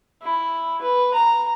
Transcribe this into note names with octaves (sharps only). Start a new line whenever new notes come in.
E4
B4
A#5